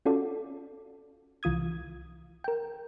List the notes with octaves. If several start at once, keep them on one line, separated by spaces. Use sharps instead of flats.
C#4 F4 F#4 A4 D5
C2 E3 F4 D#6 G#6
A#4 G5